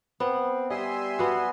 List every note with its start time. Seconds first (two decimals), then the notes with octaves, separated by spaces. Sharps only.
0.20 B3 C4
0.70 G3 D#5 E5 G#5 C6
1.19 B3 F#4